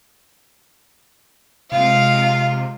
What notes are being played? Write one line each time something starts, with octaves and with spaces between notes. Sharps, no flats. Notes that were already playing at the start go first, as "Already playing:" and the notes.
C3 G#3 F4 F5